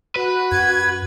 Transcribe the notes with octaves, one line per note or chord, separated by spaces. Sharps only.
F#4 B4
F#2 G#6